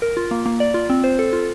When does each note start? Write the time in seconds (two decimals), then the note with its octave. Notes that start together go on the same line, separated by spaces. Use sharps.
0.02 A#4
0.17 F4
0.31 A#3
0.46 A#3
0.60 D5
0.74 F4
0.90 C4
1.04 C5
1.19 A4
1.33 F4